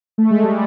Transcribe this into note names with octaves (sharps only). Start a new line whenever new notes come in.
A3
G#3
G3